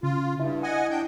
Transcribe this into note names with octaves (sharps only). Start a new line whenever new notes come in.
C#3 F4
G2 E4
D#5 F#5 G#5
D4 G5 G6